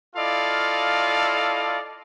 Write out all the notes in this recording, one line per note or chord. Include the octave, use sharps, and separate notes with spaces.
E4 F4 A4 D5 D#5 F5